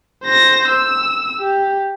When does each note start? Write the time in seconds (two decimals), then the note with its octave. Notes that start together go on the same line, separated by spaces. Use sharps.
0.23 C5 A#6
0.68 E6
1.39 G4